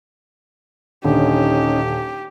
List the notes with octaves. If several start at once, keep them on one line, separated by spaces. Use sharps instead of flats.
D#1 D3 C#4 D#4 G4